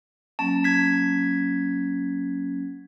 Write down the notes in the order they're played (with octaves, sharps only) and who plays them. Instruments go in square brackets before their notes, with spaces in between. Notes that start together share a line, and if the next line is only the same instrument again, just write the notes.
[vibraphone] F#3 A#3 C#4 [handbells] A5
[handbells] G#6 B6